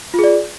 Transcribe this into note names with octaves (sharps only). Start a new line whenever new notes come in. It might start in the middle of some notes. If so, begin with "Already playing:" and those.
F4 G#4 D5